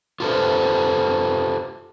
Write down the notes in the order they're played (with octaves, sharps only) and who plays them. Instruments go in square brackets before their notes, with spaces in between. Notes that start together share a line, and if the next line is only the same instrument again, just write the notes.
[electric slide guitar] F4 G4 A4 B4 C5